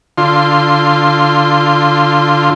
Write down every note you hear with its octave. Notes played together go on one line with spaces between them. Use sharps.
D3 F4 C6